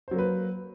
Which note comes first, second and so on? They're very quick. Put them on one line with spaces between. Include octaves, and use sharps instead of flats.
C5 F#3 A#3 B4